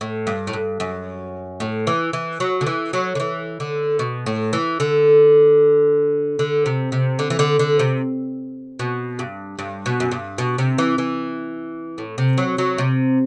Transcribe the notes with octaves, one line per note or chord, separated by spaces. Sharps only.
A2
G2
A2
G2
F#2
A2
E3
E3
F#3
D3
E3
F#3
D3
E3
D3
B2
A2
E3
D3
D3
C3
C3
D3
E3
D3
D3
C3
B2
G2
G2
B2
F#2
G2
B2
C3
E3
E3
A2
C3
F#3
F#3
C3